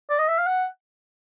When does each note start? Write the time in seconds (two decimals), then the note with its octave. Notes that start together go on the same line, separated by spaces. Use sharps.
0.10 D5
0.19 D#5
0.28 E5
0.38 F5
0.46 F#5